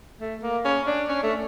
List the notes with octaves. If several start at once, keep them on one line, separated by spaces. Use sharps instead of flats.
A3
A#3
C#4
D4
C#4
A3